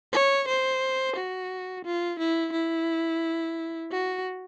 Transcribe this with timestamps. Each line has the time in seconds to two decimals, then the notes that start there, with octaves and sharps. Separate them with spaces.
0.13 C#5
0.48 C5
1.16 F#4
1.85 F4
2.19 E4
2.53 E4
3.91 F#4